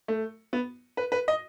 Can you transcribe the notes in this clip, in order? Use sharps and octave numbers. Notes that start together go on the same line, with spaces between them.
A3
B3
B4
B4
D#5